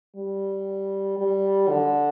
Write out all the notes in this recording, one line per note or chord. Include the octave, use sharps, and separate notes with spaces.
G3
G3
D3